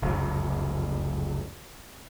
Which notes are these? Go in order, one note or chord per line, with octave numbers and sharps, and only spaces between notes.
F1 C#2 F#2